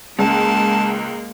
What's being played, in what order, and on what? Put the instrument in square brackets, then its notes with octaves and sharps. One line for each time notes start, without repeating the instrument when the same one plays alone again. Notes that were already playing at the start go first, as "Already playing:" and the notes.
[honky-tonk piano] C#2 [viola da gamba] G#3 A#3 [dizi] A5